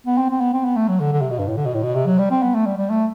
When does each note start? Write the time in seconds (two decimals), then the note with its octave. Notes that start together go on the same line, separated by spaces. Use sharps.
0.07 B3
0.18 C4
0.30 C4
0.41 B3
0.53 C4
0.65 B3
0.76 A3
0.88 F#3
1.00 D3
1.12 D3
1.21 C3
1.30 B2
1.39 G2
1.48 A2
1.57 D3
1.66 B2
1.74 A2
1.83 B2
1.95 C3
2.06 F#3
2.18 G3
2.31 C4
2.42 B3
2.55 A3
2.66 G3
2.77 G3
2.90 A3